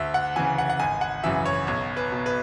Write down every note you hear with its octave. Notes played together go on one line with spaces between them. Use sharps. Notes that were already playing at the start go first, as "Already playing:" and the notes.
Already playing: D2 E5
F#5
C#3 E3 G#5
F#5
F#5
G#1 G#5
F#5
F#2 C#3 E3 E5
C#5
B1 C#5
B4
B2
B4